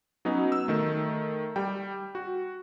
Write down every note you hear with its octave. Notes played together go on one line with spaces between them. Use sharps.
F#3 B3 C#4 D#4
E6
D#3 A3
G3 G5
F#4